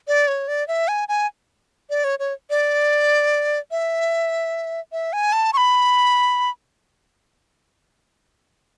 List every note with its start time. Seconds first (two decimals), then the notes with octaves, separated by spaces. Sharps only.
0.08 D5
0.28 C#5
0.48 D5
0.68 E5
0.88 G#5
1.09 G#5
1.90 D5
2.04 C#5
2.19 C#5
2.50 D5
3.71 E5
4.92 E5
5.13 G#5
5.33 A5
5.53 C#6
5.57 B5